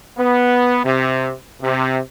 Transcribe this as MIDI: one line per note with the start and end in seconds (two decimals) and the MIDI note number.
0.17 0.79 59
0.85 1.32 48
1.62 1.98 48